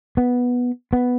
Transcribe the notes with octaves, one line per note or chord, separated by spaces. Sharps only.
B3
B3